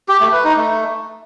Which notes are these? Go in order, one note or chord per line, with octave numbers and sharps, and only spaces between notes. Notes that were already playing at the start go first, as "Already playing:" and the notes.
G4
A3
B4
D#4
A3